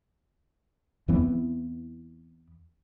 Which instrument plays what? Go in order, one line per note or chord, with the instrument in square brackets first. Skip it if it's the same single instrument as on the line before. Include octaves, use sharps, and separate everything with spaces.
[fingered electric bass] E2 E3 B3 C4